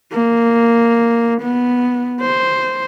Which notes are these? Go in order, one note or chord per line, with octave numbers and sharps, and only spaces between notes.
A#3
B3
C5